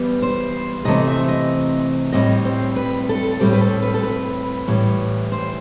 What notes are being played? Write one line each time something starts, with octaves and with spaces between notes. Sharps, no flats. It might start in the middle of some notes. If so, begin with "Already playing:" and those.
Already playing: E3 G3 B3
C5
C3 E3 A3 C4 D#5
E5
D#5
A2 G3 C4 D#5
C5
B4
A4
A2 G3 C4 G4
B4
A4
B4
A4
B4
A2 E3 G3
C5